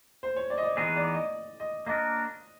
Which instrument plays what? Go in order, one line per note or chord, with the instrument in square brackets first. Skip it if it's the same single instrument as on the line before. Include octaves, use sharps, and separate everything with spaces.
[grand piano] C5
C#5
D5
D#5
D5
[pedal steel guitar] E3 G#3 B3 D#4 G#4 [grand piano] D#5
[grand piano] D5
D#5
D#5
[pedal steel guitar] A#3 D4 F#4 A#4 [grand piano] D#5